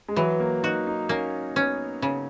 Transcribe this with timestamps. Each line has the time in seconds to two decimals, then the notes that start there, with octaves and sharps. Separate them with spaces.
0.08 G#3
0.16 E3 F#3
0.40 A#3
0.63 D#4 F#4
0.87 D#4
1.09 A#3 C#4
1.56 B3 C#4
2.02 C#3